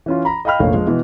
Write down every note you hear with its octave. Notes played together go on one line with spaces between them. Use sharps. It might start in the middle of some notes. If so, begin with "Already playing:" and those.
E3 C#4 F4
A#5 B5
D#5 F5 G5 B5 F6
F1 A#1 A3 A#3 C#5 F5
F3 G#3
B2 E3 B3